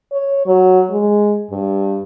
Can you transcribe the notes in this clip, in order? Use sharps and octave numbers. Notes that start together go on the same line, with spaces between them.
C#5
F#3
G#3
G2